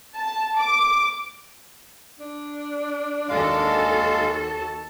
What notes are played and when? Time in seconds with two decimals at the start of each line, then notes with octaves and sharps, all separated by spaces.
0.16 A5
0.57 D6
2.19 D4
3.29 D#2 G#3 F#4 A4 F5
4.39 A5